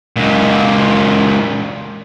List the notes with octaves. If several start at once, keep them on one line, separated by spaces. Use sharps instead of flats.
C#2 A#2